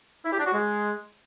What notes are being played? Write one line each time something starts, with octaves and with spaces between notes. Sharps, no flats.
E4
G4
D4
F#4
G#3